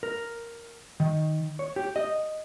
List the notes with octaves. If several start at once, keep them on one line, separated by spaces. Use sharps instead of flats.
A#4
D#3
C#5
G4
D#5